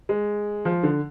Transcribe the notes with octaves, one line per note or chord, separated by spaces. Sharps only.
G#3
F3
D3